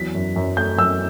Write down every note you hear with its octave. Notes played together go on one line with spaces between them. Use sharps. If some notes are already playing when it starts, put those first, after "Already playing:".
Already playing: E2 F#3 B6
F#2
F#2
A3 G6
F#2 E6